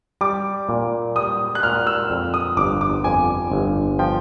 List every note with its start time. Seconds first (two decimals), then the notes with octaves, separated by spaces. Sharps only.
0.21 G3 D6
0.69 A#2
1.16 G3 D#6
1.55 F#6
1.63 A#2 F6
1.87 E6
2.10 F2
2.34 D#6
2.57 G1 D6
2.81 D6
3.04 F2 G#5
3.52 G1
3.99 F3 G5